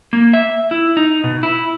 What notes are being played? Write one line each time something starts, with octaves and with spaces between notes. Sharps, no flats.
A#3
E5
E4
D#4
B2
E4